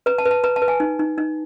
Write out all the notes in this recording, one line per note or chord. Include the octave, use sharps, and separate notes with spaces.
B4 A#5
A5
B4
A5
B4 A#5
A5
B4
G#5
D#4
D#4
D#4